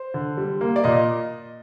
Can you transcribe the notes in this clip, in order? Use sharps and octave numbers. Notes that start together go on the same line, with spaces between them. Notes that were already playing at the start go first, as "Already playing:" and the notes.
Already playing: C5
D3
G3
A#3
D5
A#2 D#5